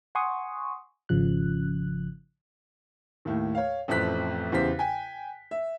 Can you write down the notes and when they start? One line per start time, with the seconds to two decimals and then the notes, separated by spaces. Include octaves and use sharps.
0.15 F#5 G#5 C6 C#6 D#6
1.09 G#1 C#3 F3 F#6
3.25 D#2 A2
3.55 C#5 F5
3.88 A1 F2 A3 C4 F#6 B6
4.52 E2 C#3 G4 C5 B6
4.79 G5 G#5
5.51 E5